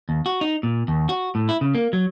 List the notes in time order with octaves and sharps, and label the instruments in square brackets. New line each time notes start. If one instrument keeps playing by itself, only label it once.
[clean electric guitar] D#2
F#4
D#4
A#2
D#2
F#4
A2
E4
C#3
A#3
F#3